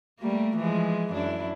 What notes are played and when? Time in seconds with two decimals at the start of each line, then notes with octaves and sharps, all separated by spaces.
0.19 G3 A3 A#3
0.56 E3 F3 G#3
1.13 F#2 D4 E4